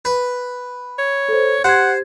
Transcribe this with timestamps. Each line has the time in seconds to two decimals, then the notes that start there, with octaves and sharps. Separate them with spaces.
0.05 B4
0.99 C#5
1.28 A4 C5
1.64 G4 C5 F#5 G#6